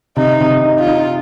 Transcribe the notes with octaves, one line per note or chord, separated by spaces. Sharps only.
C3 D#4
C3
D#4
F4
D#4